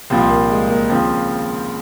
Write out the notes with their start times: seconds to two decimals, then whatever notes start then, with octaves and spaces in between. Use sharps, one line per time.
0.10 C2 A#2 F3 C4
0.30 A#3
0.50 G#3
0.70 A#3
0.90 D#2 C#3 F3 C4